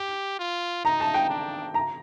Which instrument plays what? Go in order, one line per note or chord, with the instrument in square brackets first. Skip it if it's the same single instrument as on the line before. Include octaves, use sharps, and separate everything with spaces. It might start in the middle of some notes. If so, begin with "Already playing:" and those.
Already playing: [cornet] G4
F4
[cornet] D#4 [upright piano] A#5
[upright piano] A5
G5
[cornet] D4
[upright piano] A#5